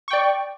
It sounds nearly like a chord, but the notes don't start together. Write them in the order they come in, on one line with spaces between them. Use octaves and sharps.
C#6 G5 D5